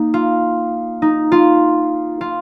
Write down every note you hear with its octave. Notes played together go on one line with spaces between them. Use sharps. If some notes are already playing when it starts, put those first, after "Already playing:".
Already playing: A#3 D#4
F4
D#4
F4
F4